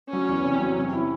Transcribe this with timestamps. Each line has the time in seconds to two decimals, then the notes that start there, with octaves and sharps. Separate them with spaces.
0.13 F#3 C#4
0.29 E2
0.44 C3
0.60 F#3
0.77 C3
0.93 E4